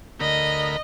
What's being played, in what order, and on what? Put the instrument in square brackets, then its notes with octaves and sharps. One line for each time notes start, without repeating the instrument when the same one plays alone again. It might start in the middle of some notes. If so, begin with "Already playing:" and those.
[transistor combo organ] D2 A#4 B5 [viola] D#5